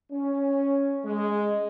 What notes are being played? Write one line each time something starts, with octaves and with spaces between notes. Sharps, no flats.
C#4
G#3